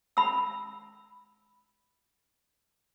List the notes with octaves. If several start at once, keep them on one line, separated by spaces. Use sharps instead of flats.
B5 E6